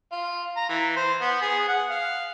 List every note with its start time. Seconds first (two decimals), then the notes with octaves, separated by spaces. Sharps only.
0.12 F4
0.57 A#5
0.69 E3
0.96 C5
1.21 B3
1.42 G#4
1.68 F#5
1.90 F5